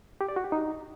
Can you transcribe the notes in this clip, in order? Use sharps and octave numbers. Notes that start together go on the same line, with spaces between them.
G4
D5
F#4
G4
D#4